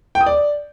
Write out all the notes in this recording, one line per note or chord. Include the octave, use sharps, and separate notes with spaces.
G5
D#6
D5